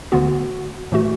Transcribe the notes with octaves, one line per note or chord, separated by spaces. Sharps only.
D2 D3 B3 F#4
A2 E3 A3 F#4